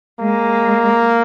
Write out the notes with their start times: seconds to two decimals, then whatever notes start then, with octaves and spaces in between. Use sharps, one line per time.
0.20 G#3 A#3